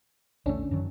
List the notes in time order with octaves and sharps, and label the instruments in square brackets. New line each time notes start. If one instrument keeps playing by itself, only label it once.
[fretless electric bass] A#1 E2 A3 [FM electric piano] D3 C#4 D4
[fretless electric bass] F#2 D#3 F#3